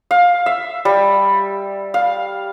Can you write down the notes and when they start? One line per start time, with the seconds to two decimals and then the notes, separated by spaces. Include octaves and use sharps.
0.11 F5
0.46 E5
0.85 G3
1.94 F5